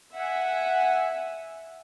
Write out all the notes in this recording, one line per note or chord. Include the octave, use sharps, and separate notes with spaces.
E5 F#5 G#5